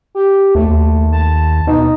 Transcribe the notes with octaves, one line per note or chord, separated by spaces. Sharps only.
G4
D#2 A3
A5
B2 D#4